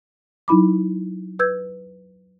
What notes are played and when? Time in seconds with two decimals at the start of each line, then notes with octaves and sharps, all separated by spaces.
0.48 F#3 D#4 E4 B5 D6
1.39 B4 E6 G6 G#6